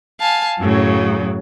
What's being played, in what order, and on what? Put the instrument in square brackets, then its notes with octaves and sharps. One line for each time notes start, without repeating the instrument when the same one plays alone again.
[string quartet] F5 G#5 A5
F#2 A2 C#3 F#3